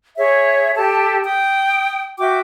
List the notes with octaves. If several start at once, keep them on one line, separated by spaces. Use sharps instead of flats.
G#4 C#5 E5
G4 A4 A5
G5 D#6
F#4 E5 G5 D6